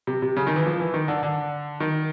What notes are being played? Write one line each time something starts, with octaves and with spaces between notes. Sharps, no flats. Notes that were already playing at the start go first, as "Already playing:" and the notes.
C3
C3
C#3
D#3
E3
F3
E3
D#3
D3
D3
D#3